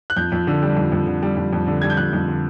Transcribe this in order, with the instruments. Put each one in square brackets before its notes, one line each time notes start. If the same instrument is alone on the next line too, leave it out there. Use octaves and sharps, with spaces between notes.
[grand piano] F#6
F2 G6
F2
D3
G3
F2
F2
D3
G3
F2
F2
D3
G3 G#6
G6
F2 F#6
F2
D3